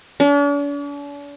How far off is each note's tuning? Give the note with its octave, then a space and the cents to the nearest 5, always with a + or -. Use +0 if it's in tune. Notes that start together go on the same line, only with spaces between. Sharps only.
D4 -45